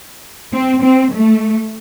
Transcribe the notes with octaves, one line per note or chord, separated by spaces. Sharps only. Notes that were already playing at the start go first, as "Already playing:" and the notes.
C4
C4
A3